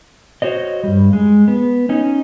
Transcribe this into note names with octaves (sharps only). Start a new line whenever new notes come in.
F#4 C5 C#5 D#5
G2 G3
G#3
B3
C#4 D#4